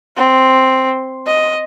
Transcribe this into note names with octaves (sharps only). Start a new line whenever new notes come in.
C4
D#5